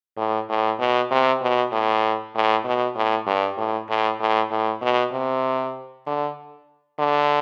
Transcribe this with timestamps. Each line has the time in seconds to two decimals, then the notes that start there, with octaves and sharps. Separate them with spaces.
0.17 A2
0.49 A2
0.79 B2
1.11 C3
1.42 B2
1.72 A2
2.35 A2
2.65 B2
2.96 A2
3.27 G2
3.58 A2
3.90 A2
4.20 A2
4.50 A2
4.82 B2
5.13 C3
6.07 D3
6.99 D3